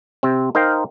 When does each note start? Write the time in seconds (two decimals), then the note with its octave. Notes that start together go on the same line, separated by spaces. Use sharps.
0.23 C3 C4
0.55 D#4 A#4 C5 F5 G5